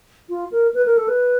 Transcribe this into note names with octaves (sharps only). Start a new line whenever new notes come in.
F4
A#4
B4
A#4
A4
B4